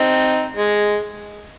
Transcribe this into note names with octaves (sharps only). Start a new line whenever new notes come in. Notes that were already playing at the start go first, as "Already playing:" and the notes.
Already playing: C4 D#4
G#3